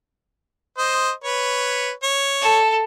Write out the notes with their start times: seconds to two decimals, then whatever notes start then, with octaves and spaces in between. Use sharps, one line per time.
0.78 C5 D#5
1.24 B4 C#5
2.03 C#5
2.40 A4